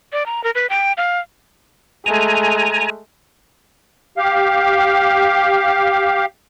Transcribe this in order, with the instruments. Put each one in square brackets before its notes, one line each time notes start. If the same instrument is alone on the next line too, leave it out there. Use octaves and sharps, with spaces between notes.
[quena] D5
A#5
A#4
B4
G5
F5
[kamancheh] G#3 A3 [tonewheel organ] G#5 A#5
[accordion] G4 F5